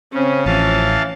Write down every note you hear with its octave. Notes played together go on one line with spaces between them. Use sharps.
C#3 C4 C#4
A1 E3 F3 F5 A5